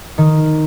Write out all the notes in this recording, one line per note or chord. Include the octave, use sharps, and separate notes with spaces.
D#3